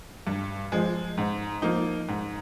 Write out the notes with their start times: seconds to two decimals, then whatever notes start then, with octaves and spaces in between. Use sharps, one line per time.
0.27 G2
0.72 F3 G#3
1.17 G#2
1.62 F3 A#3 D#4
2.08 G#2